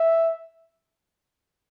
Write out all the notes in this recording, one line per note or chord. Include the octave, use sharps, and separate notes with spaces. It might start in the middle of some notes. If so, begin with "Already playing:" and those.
Already playing: E5